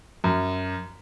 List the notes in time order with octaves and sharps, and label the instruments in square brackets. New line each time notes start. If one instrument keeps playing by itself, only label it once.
[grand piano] F#2